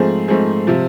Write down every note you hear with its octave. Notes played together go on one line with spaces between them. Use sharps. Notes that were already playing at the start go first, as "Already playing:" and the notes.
Already playing: G#2 F3 A3 C4 G#4
G#2 F3 A3 C4 G#4
C3 F3